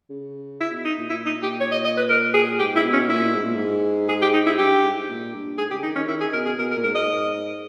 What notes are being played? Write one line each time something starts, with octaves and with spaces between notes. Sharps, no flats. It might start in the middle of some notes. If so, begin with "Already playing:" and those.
C#3
E4
B2
D#4
A#2
A#2 E4
D#4
A#2
G4
C#5
D#5
D#5
B4
A#4
G#4
G#2 G4
E4
B2
C#4
A#2 E4
G#2
A#2
G#2
G#4
G4
D#4
E4
G2 G4
G#2
A#2
G2
G#2 G#4
C#3 G4
D#3 D#4
D#3 C#4
D#3 E4
G#4
B2 A#4
G#4
B2 A#4
A#4
A#2
G#2 A#4
D#5